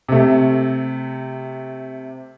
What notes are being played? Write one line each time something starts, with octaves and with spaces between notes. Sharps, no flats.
C3 A3